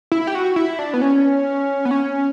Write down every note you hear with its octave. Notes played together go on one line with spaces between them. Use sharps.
E4
G4
F#4
E4
D4
B3
C#4
B3
C#4